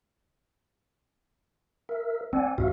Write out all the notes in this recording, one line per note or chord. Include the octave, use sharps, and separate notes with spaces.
A#4 E5
C4 D5 F#5 G#5
D#2 G#2 F#4 E5 F5